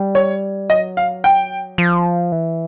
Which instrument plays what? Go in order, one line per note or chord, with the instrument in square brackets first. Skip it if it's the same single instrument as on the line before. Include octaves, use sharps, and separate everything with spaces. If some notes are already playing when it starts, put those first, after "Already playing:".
Already playing: [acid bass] G3
[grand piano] C#5
[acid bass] F#3 [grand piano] D#5
[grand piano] F5
G5
[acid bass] F3
E3